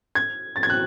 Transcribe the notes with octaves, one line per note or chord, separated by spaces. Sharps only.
G#6
A6
G#6
F#6